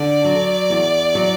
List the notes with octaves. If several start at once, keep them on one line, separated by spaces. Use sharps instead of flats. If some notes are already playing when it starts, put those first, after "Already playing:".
Already playing: D3 D5
F#3
E2
F#3